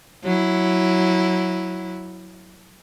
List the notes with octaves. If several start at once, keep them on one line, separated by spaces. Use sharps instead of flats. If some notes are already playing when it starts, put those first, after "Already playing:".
F#3 E4